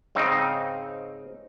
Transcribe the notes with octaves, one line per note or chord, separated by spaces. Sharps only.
G#2 C#3 C4 D#4